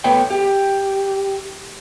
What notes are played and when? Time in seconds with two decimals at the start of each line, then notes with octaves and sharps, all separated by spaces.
0.04 A3 B3 B4 C#5 E5 G5
0.30 G4